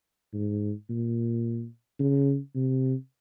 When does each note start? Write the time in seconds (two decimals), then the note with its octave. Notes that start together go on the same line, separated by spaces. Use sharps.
0.33 G#2
0.89 A#2
1.99 C#3
2.55 C3